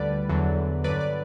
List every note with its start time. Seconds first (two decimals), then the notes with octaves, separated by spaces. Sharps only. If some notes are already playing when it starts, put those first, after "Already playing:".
Already playing: D2 D3 G3 B4 D5
0.29 E2 D3 F#3
0.84 G2 D3 F#3 B4 D5
1.00 D5